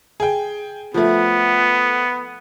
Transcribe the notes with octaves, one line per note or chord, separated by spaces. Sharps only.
G#4 G5
F3 A3 B3